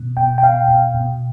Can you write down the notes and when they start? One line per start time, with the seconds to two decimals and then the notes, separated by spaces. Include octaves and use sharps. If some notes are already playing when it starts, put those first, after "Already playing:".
Already playing: B2
0.17 B2 G5
0.38 G5
0.43 B2 F5
0.68 B2
0.94 B2